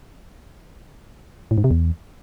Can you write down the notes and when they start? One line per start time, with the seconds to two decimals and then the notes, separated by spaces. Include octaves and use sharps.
1.51 A2
1.58 G#2
1.64 C3
1.71 E2